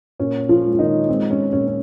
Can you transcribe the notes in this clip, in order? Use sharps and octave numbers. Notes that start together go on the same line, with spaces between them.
A#2 C#4
F3 F4
G#3
F4
D#3 D#4
G#3 C4
C#4
A#2 C#4
C#4